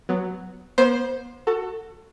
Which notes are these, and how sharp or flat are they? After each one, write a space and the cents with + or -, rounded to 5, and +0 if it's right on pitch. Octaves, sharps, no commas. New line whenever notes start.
F#3 +0 B3 +10
B3 -40 C5 +5
F#4 +0 A4 +25